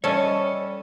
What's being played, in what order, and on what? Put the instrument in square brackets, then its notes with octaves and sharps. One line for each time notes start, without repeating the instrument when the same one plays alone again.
[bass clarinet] G3 [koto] C#4 A4 [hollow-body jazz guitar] C#5 D#5